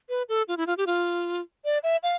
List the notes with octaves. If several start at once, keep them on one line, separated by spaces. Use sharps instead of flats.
B4
A4
F4
E4
F4
G4
F4
D5
E5
F5